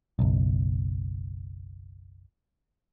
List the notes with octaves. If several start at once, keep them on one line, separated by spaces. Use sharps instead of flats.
F#1 B1